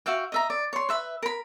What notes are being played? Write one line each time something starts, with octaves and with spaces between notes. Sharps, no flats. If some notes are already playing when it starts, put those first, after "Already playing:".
F#4 E5 F5 G5
D#5 E5 A#5
D5
C#5 C6
B4 E5 B5
A#4 B5